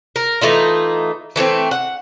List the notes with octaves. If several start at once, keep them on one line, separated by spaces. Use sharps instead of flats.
A#4
E3 A3 D#4 F4
E3 A3 B3 C4
F#5